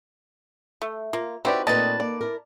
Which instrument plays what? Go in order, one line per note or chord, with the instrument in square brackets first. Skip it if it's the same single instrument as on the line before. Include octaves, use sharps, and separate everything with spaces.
[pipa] A3
[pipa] A#3 [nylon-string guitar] F4
[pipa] C4 F#4 B4 [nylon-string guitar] D#4 [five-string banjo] E4 G4 D5
[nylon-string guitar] A#2 A3 C4 [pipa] D#3 B4 [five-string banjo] D#5 [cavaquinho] A5
[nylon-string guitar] A#3 [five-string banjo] D5
[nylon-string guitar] E4 A#4